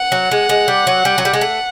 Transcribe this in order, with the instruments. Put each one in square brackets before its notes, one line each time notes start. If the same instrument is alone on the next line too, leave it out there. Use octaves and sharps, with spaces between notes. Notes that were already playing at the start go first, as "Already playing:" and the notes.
Already playing: [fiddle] F#5
[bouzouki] F#3
G#3
G#3
G3
F#3
G3
F#3
G3
G#3
A3